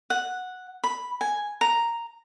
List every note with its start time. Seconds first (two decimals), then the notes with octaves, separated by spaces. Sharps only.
0.10 F#5
0.84 B5
1.21 G#5
1.61 A#5